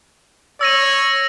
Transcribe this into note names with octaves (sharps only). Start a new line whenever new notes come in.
C#5 E6 A#6 D#7